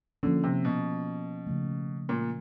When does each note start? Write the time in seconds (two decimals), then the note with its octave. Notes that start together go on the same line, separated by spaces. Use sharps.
0.23 D3 F3 A#3 C#4
0.44 C3
0.65 B2
1.47 C#3 F3 A3
2.09 A#2